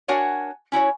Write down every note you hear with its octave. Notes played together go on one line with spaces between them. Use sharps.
D4 F#4 A#4 C#5 F#5 G#5
C#4 E4 F#4 C#5